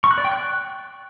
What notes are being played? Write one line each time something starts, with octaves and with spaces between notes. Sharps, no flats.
C#6
F#6
D5
G5
F#6